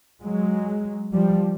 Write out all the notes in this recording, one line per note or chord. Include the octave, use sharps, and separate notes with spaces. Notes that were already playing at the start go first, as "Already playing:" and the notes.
F#3 G#3
F3 G3